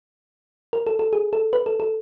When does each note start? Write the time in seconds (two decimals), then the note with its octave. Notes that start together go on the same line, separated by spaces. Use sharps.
0.73 A#4
0.87 A4
0.99 A4
1.13 G#4
1.33 A4
1.53 B4
1.66 A4
1.80 A4